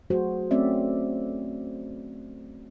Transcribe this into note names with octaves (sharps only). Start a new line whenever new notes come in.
F#3 A3 F#4 G#4 C5
A3 C4 C#4 D5 E5